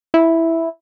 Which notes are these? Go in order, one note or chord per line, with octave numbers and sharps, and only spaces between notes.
E4